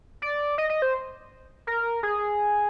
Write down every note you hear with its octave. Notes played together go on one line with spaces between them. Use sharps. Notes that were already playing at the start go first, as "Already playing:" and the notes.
D5
D#5
D#5
C5
A#4
G#4